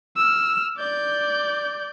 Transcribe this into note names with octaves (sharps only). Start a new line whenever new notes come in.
E6 F6
D5 G6